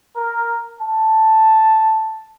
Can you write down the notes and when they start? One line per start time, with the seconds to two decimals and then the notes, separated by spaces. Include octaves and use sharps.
0.16 A#4
0.81 A5